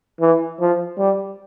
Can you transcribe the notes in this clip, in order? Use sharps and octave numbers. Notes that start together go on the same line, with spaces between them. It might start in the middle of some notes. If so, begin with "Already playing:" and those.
E3
F3
G3